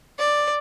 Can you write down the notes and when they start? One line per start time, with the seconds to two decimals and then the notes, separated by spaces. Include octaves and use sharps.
0.18 D5